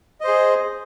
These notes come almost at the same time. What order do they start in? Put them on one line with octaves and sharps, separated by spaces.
D#5 C5 G#4